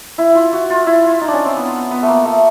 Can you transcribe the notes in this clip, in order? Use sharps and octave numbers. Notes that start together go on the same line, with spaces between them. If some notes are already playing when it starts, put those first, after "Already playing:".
E4
F4
F#4
F4
E4
F4
D#4
D4
C#4
C4
B3
B3
A3
A#3
A3